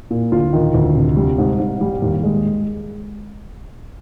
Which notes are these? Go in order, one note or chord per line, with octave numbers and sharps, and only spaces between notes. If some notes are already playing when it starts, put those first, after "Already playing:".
A#2
D2 F4
D#3
D2
C3
G3
G#2
G#2
G3
D#2
G#3